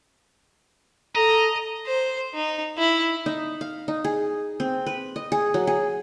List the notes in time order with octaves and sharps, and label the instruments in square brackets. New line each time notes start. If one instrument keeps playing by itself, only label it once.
[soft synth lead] A4 [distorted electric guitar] D#5 [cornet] A#5
[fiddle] C5
D#4
E4
[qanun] D#4
F5
D#4
G#4
C4
B4
D#5
G#4
F#3
G#4